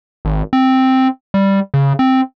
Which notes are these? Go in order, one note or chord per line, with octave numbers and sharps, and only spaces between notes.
G#1
C4
G3
C#3
C4